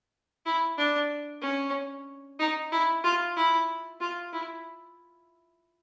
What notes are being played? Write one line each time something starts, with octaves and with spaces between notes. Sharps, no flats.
E4
D4
C#4
D#4
E4
F4
E4
F4
E4